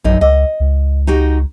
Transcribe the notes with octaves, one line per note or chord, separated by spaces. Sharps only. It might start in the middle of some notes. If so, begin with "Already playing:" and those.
A#1 F#2 D#4
C#2 D#5
C#2
D#4 F#4 G4